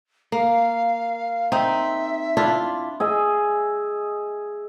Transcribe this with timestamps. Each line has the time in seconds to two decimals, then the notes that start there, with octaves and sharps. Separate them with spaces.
0.32 A#3 F5
1.52 C4 D#4 E5
2.37 D4 E4 F4
3.00 G#4 D#5 E5